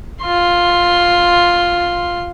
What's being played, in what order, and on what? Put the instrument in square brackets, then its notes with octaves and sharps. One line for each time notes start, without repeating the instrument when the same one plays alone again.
[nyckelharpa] F4 C6